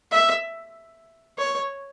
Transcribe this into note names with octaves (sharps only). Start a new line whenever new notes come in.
E5
C#5